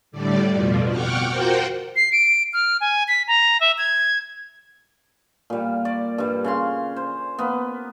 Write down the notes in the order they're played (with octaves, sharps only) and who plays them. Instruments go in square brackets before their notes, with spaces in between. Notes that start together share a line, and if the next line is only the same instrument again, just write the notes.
[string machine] A2 D3 G3 D5
F2 B2 F3
F#5 G5 C#6 D6 F6
F4 F#4 A#4 C5 F#5 G5
[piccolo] C7
D7
F6
G#5
B6
A#5
E5
G#6
[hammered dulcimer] A#2 G3
D5
G2 G3
C#3 F5 C6
C5
A#3 B3